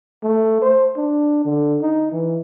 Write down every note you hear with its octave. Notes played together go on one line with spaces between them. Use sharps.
A3
C5
D4
D3
D#4
E3